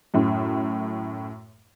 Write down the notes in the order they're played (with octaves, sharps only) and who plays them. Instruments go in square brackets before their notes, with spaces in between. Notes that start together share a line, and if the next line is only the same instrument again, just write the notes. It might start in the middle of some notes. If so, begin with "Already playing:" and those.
[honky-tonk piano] F#2 A2